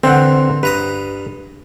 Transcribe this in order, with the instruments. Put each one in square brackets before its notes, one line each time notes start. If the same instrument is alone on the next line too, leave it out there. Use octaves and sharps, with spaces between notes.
[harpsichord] D3 E3 [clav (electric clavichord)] C4 F#5
[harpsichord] G2 A#5 D#6 [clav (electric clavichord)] B4